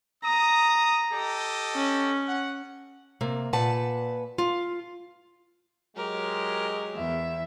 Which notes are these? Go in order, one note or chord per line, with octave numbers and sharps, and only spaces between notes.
A#5 D#6
G4 A4 D#5
C#4
F#5
C3 A#3
A#2 B4 F#5 A5
F4
F#3 G#3 G4 A#4
E2 E5